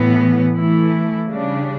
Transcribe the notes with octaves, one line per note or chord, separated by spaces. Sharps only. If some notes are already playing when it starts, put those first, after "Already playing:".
Already playing: A2 E3 B3
E3 A3 E4
C#3 G3 D4